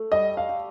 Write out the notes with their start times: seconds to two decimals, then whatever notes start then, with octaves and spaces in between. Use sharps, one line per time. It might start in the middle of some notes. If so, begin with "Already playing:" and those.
Already playing: A3
0.12 G3 D#5
0.37 F5
0.49 G4